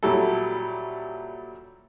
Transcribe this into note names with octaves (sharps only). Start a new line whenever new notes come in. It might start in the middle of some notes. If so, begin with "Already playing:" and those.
A#2 F#3 G3 E4 A4